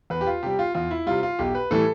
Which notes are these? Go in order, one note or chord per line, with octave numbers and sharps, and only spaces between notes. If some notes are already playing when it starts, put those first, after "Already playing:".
E2 B4
G4
F4
C3 G3 G4
F4
E2 F4
E4
C3 G3 F4
F4
B1 G4
B4
A2 E3 G3 A4